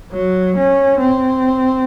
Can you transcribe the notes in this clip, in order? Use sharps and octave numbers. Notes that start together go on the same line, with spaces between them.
F#3
C#4
C4